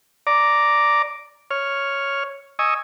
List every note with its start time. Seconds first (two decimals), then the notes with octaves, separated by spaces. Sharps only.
0.27 D5 A#5 D6
1.51 C#5 F6
2.59 D#5 G#5 C#6 D#6 E6